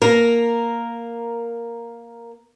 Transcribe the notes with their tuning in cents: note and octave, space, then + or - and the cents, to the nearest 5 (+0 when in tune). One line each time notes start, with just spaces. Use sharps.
A#3 +0 A#4 +0